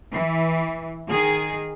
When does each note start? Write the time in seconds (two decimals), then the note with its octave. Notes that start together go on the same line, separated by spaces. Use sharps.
0.13 E3
1.09 D#3 G#4